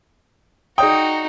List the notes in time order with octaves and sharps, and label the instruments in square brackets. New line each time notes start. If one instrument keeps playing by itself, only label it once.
[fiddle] D#4 F#4 [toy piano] G#4 D5 D#6 [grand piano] G5